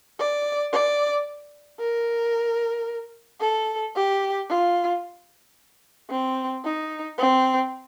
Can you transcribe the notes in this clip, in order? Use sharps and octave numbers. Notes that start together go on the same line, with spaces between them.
D5
D5
A#4
A4
G4
F4
C4
D#4
C4